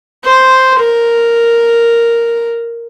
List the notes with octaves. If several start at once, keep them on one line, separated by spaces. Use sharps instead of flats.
C5
A#4